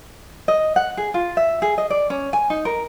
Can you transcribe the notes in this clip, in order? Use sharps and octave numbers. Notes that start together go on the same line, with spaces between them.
D#5
F#5
G#4
F4
E5
G#4
D#5
D5
C#4
G#5
D#4
A#4